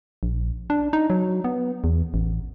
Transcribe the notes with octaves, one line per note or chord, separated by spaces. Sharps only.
A#1
D4
D#4
F#3
B3
E2
A1